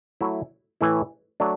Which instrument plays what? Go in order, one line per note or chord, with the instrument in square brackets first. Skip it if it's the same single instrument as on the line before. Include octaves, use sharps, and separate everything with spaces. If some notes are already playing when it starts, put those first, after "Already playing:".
[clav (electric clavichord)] F#3 A3 E4
A2 E3 A3 E4
F#3 A3 D4